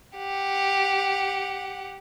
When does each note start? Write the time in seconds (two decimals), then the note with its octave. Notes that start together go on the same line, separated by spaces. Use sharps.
0.17 G4 F#5